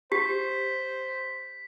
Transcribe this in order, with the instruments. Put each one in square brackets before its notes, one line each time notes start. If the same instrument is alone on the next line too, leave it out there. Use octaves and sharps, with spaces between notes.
[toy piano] G4 [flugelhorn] C5 [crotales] B6